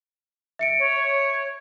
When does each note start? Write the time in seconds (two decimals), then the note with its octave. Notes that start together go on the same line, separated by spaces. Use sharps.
0.59 E5 C#7 D7
0.79 C#5